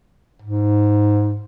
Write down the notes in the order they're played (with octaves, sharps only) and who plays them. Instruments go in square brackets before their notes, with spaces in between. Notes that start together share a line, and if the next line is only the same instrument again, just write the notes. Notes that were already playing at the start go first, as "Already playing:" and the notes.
[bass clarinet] G#2